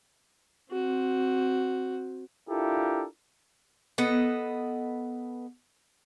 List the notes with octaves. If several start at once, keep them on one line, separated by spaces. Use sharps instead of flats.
C4 F#4
D4 E4 F4 G4 A4 A#4
B3 A4 B4 D#5